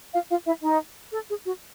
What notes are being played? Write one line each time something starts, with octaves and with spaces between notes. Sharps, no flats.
F4 F5
F4 F5
E4 E5
D#4 D#5
A4
G#4
F#4